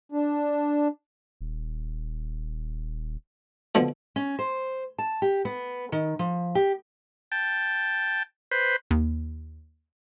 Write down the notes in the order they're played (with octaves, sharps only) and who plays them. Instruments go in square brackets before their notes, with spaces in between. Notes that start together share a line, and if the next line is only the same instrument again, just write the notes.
[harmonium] D4
[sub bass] D#1
[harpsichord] B2 D3 F3
[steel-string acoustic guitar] C#4
C5
A5
G4
B3
D#3
F3
G4
[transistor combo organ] G5 A5
B4 C5
[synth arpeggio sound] D#2